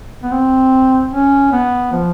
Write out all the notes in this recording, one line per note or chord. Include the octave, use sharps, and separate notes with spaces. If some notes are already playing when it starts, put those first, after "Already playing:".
B3
C4
C#4
B3
F3